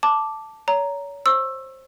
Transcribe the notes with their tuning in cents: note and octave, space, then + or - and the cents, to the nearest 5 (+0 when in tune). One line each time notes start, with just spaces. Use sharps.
A5 +0 D6 +0
C#5 +35 A#5 +0
C5 +15 C#6 -35 E6 +5